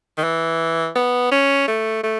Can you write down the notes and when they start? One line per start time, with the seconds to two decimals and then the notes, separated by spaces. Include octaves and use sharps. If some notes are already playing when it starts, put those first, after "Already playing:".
0.18 D#3
0.24 E3
0.96 B3
1.32 C#4
1.68 A3
2.03 A3